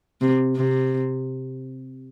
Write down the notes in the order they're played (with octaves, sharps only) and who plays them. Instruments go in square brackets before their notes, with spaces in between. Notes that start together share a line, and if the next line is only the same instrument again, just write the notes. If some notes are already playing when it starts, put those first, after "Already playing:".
[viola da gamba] C3
C3